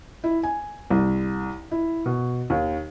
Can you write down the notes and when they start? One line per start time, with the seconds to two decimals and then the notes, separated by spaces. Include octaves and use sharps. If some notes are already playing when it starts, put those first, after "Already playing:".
0.24 E4
0.43 G#5
0.90 C2
1.71 E4
2.06 B2
2.50 D#2